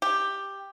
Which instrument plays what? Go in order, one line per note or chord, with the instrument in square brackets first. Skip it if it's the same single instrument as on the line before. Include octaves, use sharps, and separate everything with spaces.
[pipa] G4